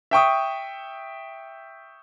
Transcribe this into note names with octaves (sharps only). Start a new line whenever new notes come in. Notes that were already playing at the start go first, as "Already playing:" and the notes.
E5 G5 C#6 D#6